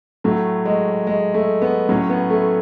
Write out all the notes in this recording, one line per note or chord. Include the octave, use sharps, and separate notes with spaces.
A2 F#3 A3
G#3
G#3
A3
B3
A2 F#3 C#4
B3
A3